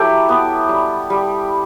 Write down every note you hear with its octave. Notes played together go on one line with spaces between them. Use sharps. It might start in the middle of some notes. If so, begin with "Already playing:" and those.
Already playing: F#3 E4 G4 A4
B3
G3
G3